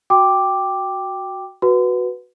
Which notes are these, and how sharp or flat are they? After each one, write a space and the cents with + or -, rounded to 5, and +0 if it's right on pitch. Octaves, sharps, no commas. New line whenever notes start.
F#4 +0 G5 +0 D6 +0
F#4 +0 B4 +0